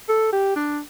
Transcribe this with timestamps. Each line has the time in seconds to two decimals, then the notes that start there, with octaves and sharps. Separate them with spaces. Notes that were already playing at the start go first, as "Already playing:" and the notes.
0.09 A4
0.33 G4
0.56 D4